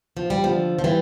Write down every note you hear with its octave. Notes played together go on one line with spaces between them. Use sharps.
F3
G3
D3 F3
F3
E3 G3